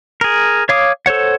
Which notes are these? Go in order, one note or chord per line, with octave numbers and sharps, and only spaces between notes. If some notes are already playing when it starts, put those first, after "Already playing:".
G#4 A#4
C#5 F5 D6 D#6
A4 C5 C#5 F#5